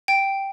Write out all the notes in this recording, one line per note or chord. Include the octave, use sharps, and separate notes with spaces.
G5